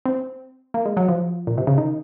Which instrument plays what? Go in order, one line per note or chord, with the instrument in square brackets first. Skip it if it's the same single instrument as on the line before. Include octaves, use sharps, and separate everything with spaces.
[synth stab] C4
A#3
G#3
F#3
F3
A#2
C3
C#3
D#3